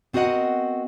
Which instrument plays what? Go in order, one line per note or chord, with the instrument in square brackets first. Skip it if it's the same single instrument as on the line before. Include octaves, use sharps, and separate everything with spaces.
[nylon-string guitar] B3 C4 F#4 A#4 D#5 F#5